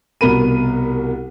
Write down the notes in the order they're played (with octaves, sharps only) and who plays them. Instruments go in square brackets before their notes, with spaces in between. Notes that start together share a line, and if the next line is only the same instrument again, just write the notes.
[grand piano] C2 B2 B3 A#4 B5 D#7